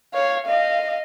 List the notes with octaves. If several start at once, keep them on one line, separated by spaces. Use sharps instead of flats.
C#5 F5
D#5 F5